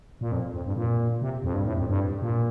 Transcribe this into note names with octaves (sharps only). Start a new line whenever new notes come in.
A#2
F2
F2
G2
A#2
C3
F2
G2
A2
F2
G2
A#2